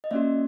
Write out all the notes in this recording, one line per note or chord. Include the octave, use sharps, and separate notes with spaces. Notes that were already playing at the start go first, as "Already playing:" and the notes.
D#5
A#3 C#4 F#4 D5 E5